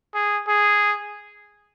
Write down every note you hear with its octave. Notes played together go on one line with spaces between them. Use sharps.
G#4
G#4